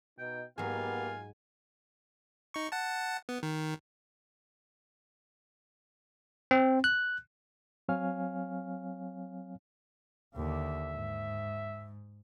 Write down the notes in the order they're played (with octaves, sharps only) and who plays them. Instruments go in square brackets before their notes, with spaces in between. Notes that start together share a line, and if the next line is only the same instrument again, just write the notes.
[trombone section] B2 D#4 [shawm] G5
[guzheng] G#2 F#3 [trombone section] A#3 B3 G4 [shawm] F4 [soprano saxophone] G#5
[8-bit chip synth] D#4 C#6
F#5 A5
B3
D#3
[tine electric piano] C4
F#6
[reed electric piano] F#3 C4 C#5 F5 G#5 F6
[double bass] D#2 D3 [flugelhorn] E5
[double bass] G#2